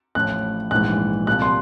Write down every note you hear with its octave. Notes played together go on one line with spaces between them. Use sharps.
A1 A2 F3 F#6
A#1 G#2 E3 F#6
C2 A#2 F3 F#6
C6